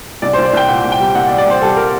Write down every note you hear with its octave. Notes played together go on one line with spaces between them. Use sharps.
C2 D5
C2 C5
D5
C2 G5
A#2 F#5
C2
G5
G3
C2 F#5
D5
G3
D5
C2 C5
G3 A4
A#4